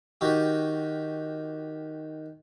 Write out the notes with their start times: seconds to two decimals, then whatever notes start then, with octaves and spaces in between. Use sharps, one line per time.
0.21 D#3 F#4 G4